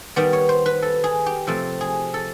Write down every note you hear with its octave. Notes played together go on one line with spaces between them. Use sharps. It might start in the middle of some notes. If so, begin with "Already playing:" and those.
D#3 G3 B3 D5
C#5
C5
B4
A4
G#4
G4
C3 F3 A3 C4 A4
G#4
A4